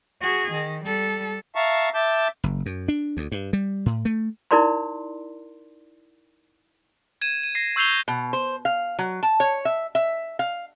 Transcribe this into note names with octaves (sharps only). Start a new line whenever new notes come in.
F#4 G#4
D#3
G3 A4
E5 F5 A5 A#5 C#6
E5 A5 D6 G6
F#1
F#2
D4
D2
G2
G3
A2
A3
D#4 E4 A#4 D5 B5 C6
G#6 D#7 E7
D#7
A#6 C7
C#6 E6 G6 C7 F7 G7
B2
C5
F5
F#3
A5
C#5
E5
E5
F5